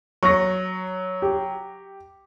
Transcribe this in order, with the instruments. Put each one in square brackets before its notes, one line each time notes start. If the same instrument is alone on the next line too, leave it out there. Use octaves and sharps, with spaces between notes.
[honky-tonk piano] F#3 [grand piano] C#6 A#6
[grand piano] G4